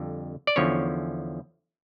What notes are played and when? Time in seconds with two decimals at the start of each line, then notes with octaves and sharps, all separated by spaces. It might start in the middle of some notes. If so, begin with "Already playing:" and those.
Already playing: F2 D3 G3
0.47 D5
0.56 E2 D3 F3 C#4 C#5